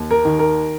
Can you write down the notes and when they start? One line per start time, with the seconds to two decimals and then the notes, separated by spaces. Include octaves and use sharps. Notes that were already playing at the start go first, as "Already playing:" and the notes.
Already playing: D#2
0.11 A#4
0.25 D#3
0.39 A#4